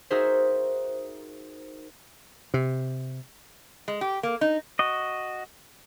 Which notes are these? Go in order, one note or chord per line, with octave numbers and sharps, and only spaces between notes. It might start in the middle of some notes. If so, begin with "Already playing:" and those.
D#4 F#4 G#4 A#4 C5 E5
C3
G#3
G4
A#3
D#4
F#4 D#5